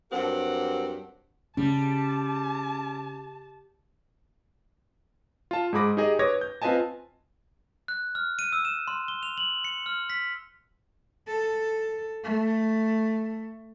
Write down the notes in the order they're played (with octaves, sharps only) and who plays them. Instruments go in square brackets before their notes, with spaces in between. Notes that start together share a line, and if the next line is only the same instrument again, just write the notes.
[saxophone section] G2 F#3 C4 G4 A#4 F#5
[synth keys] C#3 [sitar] G3 [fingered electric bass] C#4 [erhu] A5
[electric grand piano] F4 A5
G#2 D#4 G#4 B5 D6 A#6
D#4 G4 G#4 D#5
B4 C#5 D6 D#6 G#6 A#6
G6
C4 F4 B4 D#5 G#5 A5
[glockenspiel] F#6
F6
D#7
E6
E7
C6
G7
F7
F#7
C#7
F6
B6
[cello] A4
A3